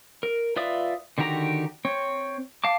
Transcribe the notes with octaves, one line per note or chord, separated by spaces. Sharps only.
A#4
F4 B4 D5 E5 D#6
D3 D#3 F#4 G4 A#5
C4 C#5
F5 A5 D6